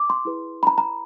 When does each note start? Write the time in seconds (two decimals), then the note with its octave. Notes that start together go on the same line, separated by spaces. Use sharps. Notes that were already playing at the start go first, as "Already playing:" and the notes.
Already playing: D6
0.10 C6
0.25 E4 G#4 B4
0.63 B5
0.67 A#5
0.78 A#5